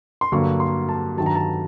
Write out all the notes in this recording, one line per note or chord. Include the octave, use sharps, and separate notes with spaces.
C6
G2 D3 F#3 A#3 C#6
C6
A5
G2 D#3 F#3 A5
A#5
A5